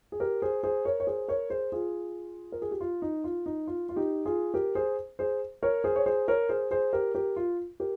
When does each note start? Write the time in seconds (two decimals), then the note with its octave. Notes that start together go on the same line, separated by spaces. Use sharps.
0.12 G#4
0.20 G4 A#4
0.42 G#4 C5
0.63 G#4 C5
0.85 A#4 C#5
1.00 C#5
1.07 G#4 C5
1.28 A#4 C#5
1.50 G#4 C5
1.72 F4 G#4
2.52 A#4
2.62 G#4
2.71 G4
2.81 F4
3.02 D#4
3.24 F4
3.46 D#4
3.67 F4
3.89 F4
3.96 D#4 G4
4.26 F4 G#4
4.54 G4 A#4
4.75 G#4 C5
5.19 G#4 C5
5.63 A#4 C#5
5.84 G#4 C5
5.96 C#5
6.06 G#4 C5
6.28 A#4 C#5
6.49 G#4 C5
6.71 G#4 C5
6.93 G4 A#4
7.15 G4 A#4
7.36 F4
7.80 G4 A#4